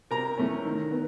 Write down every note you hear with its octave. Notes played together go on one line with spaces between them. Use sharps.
C3 A#4 A#5
E3 A3 C#4
D#3
B3